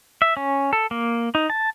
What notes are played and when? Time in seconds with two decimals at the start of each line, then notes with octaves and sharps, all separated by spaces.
0.22 E5
0.37 C#4
0.73 A4
0.91 A#3
1.35 D#4
1.50 A5